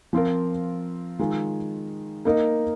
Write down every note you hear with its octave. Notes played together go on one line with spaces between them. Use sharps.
F3 C4 F4 A#4
D#3 G#3 F4
A#3 D#4 A#4 D#5